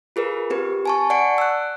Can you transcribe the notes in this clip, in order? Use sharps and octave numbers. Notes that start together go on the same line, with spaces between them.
F4 G#4 A#4 B4
C4 G4 B4
G#5 A5 C#6
D5 F#5 A5 C#6 C#7 D7
E6 F#6